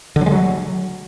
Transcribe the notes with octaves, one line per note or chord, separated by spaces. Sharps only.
D3
F#3
G#3
F#3